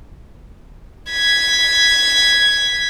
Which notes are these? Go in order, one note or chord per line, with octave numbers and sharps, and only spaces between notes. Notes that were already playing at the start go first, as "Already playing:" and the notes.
G#6 B6